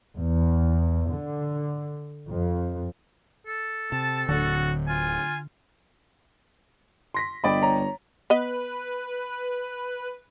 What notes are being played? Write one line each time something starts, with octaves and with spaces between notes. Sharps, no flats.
E2
D3
F2
A4
C3 A5
D1 D3 F#4
F4 G#5
C6 A#6 B6
G1 G4 D5 D#5 B5
C#5 A#5
B3 B4 D#5